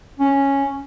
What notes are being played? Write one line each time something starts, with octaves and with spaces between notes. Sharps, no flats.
C#4